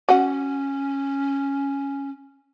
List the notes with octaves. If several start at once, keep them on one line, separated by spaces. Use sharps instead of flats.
C#4 F#4 F#5